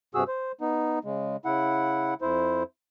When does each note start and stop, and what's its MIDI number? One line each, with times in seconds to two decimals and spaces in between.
0.15 0.24 43
0.15 0.24 48
0.15 0.24 66
0.15 0.24 68
0.15 0.24 88
0.28 0.52 72
0.61 0.99 59
0.61 0.99 63
1.05 1.36 49
1.05 1.36 56
1.45 2.14 49
1.45 2.14 64
1.45 2.14 78
2.22 2.63 41
2.22 2.63 64
2.22 2.63 72